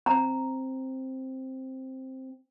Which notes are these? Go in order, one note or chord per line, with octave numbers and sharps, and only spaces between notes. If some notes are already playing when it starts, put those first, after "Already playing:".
C4 A#5